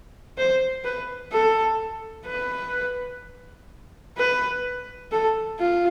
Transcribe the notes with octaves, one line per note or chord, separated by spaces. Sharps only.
C5
B4
A4
B4
B4
A4
F4